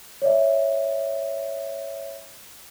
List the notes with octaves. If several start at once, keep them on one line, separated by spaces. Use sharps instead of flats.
C#5 D5 E5